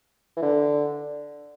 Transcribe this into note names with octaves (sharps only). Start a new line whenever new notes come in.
E3
D3